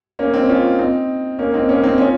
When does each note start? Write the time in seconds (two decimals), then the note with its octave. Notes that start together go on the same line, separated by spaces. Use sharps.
0.19 A#3 C#4
0.34 C4 D#4
0.49 C#4 F4
0.79 C4 D#4
1.39 A#3 C#4
1.54 C4 D#4
1.69 A#3 C#4
1.84 C4 D#4
1.98 C#4 F4